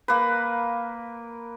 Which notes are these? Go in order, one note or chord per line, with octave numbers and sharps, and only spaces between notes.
A#3 B4